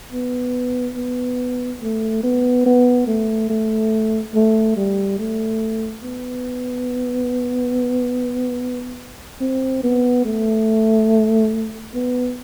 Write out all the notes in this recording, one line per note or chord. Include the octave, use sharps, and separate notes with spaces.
B3
B3
A3
B3
B3
A3
A3
A3
G3
A3
B3
C4
B3
A3
B3